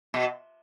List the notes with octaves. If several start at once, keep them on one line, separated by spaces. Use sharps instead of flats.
B2